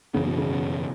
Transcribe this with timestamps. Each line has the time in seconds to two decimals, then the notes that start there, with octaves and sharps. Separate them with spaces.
0.14 F#2 C#3 E3 B3
0.26 B2
0.38 C#3
0.49 F#2 E3 B3